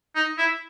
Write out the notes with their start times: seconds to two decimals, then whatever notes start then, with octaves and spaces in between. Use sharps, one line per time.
0.16 D#4
0.38 E4